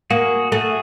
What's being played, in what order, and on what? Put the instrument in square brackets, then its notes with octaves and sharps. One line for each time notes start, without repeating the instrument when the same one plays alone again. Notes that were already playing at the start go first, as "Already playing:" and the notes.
[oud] A#3 [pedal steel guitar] F#4 G#4
[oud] A3 [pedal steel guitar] F#4 G#4